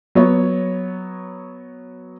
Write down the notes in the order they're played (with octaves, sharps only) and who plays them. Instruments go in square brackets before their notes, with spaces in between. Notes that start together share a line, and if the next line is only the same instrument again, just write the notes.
[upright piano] F#3 B3 C#5